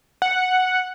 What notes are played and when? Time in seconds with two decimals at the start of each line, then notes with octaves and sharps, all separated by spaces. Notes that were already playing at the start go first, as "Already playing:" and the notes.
0.22 F#5